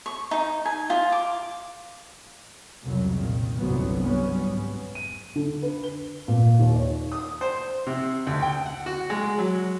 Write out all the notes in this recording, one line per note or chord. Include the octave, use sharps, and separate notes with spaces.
C#6
D#4
G#5
F4
D6
C2 F2 C#3 F#3
A#2 D#3
G1 C2 F#2 E3 F#3 B3
F#3 G3 B3 C#4
G#1
D#7
D3
B4
G7
A#2
D#2
C#5
D#6
C5
C3
D2
G5
F#5
F#4
G#3
F#3